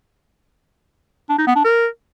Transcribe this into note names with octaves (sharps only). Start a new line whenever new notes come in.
D4
D#4
B3
D4
A#4